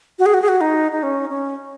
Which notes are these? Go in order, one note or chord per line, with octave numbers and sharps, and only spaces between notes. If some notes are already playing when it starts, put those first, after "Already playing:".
F#4
G#4
F#4
G#4
F#4
D#4
D#4
C#4
C#4